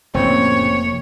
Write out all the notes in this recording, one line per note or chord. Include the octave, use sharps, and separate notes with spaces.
F1 A2 C#3 A#3 C4 C#5